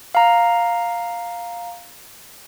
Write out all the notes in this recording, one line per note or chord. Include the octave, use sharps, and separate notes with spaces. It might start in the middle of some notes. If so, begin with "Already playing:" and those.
F5 A#5